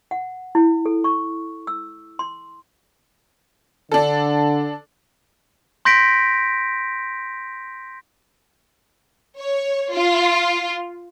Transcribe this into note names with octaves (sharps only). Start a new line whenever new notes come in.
F#5
E4
A4
C#6
E6
C6
D3 D4 A4
C6 G6 A#6 B6 D7
C#5
F4